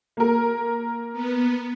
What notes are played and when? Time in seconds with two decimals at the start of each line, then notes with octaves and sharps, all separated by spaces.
0.17 A#3 A#4
1.13 B3